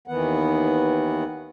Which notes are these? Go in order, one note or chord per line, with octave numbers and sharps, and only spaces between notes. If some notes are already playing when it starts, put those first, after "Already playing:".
D#2 D#3 E3 B3 F#5